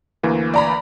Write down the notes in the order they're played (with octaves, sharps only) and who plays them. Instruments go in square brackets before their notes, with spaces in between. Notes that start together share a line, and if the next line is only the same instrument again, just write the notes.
[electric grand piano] D2 E3 A#3
[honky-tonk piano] D5 A#5 B5